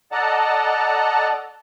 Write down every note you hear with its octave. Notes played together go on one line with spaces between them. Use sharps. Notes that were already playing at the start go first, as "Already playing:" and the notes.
A4 D5 D#5 F#5 A5 A#5